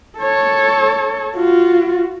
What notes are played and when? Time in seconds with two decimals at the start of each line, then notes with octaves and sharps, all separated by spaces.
0.19 A4 C#5
1.36 F4 F#4